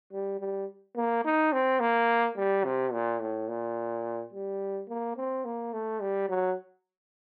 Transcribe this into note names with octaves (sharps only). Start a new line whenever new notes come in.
G3
G3
A#3
D#4
C4
A#3
G3
C3
A#2
A2
A#2
G3
A#3
C4
A#3
A3
G3
F#3